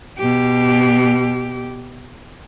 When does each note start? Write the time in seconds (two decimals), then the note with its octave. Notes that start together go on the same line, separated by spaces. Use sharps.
0.18 B2 G4